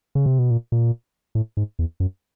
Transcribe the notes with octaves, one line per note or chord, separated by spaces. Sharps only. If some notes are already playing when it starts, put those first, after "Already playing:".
C#3
C3
B2
A#2
A#2
A2
G#2
E2
F#2